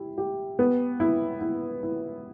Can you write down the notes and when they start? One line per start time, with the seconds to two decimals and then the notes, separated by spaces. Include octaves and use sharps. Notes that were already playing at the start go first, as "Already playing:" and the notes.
Already playing: E4 G4
0.18 G4
0.59 B3
1.00 E4
1.41 E4
1.83 E4